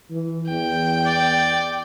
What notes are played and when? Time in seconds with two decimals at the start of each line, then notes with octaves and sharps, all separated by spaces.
0.11 E3
0.50 E2 G5
1.06 D5